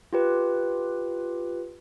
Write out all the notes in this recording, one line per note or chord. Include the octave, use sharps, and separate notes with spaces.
F4 G4 B4